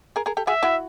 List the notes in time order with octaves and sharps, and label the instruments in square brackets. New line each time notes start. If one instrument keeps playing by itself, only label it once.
[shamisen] G#4 A#4
G#4 A#4
G4 A4
[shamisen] F#4 G#4 [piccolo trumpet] E5
[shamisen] E4 F#4